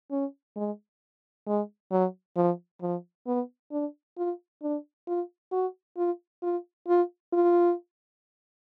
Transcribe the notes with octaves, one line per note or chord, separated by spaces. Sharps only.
C#4
G#3
G#3
F#3
F3
F3
B3
D4
F4
D4
F4
F#4
F4
F4
F4
F4